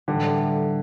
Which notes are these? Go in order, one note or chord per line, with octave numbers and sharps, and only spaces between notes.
A2 D3 E3 G3